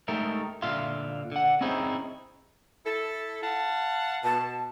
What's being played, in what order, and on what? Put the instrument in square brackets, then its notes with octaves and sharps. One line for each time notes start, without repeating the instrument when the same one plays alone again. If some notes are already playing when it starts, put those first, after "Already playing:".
[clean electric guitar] G#3 A3 D#4 G4 A#4 E5
A#2 D3 F4 E5 F5 C6
D3 F#5
C4 C#4 D#4 E4 G#4 C5
[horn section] E4 A4
F5 F#5 A5
[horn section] B2 [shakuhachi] A5